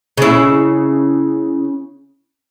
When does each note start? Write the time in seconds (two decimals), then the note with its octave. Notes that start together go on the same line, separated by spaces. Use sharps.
0.17 C#3 E4